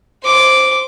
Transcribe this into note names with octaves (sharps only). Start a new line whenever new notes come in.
C5 D6